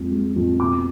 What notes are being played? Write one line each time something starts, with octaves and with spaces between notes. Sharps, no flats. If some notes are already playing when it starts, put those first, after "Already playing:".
Already playing: F2 G#3
G#3
F2
B2 D6